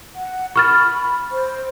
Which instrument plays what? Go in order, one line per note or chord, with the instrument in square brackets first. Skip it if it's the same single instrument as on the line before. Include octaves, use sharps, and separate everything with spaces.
[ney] F#5
[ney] B5 [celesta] C#6 F6 A6
[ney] C5